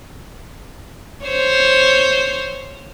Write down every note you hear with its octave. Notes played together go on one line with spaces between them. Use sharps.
C5 C#5